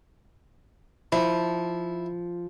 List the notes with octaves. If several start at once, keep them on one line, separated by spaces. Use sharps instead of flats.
F3 E4